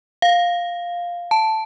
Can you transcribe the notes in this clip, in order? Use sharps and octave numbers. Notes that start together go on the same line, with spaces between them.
F5
A5